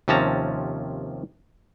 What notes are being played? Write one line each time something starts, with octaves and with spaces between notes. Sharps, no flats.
D#2 C3 F3 C#4 A5 A#5